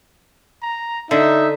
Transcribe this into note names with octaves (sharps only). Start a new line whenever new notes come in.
A#5
D3 D#4 E5